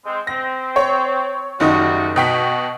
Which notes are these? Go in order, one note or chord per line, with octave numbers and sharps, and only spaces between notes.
G#3 C4
C4 A#6
C#5
F#1 D#3 G3 A3 F#4 D#5
B2 F#4 G5 B6